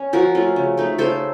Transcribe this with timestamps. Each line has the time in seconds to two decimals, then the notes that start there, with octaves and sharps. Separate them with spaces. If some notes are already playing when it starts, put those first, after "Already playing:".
Already playing: C#4
0.13 F3 F#4 A#4
0.35 A3 C#4 F4
0.56 C#3
0.77 A3 D#4
0.98 C#3 A4 C5